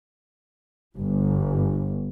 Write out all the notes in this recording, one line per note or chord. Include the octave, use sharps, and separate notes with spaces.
G1